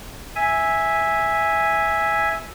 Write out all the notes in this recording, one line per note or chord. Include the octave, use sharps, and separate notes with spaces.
E5 G#5